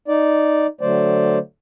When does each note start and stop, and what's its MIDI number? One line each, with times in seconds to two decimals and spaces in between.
0.08 0.67 63
0.08 0.67 74
0.81 1.38 50
0.81 1.38 54
0.81 1.38 57
0.81 1.38 72
0.81 1.38 74